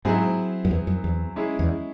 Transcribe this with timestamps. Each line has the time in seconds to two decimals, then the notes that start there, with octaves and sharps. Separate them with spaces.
0.05 G#2 F#3 C4 E4 G#4
0.65 F#2
0.71 E2
0.87 F#2
1.04 E2
1.36 G#3 C#4 E4 G#4
1.59 E2